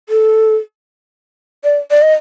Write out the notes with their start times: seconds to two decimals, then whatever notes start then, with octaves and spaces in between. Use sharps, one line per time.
0.09 A4
1.64 D5
1.91 D5
2.02 D#5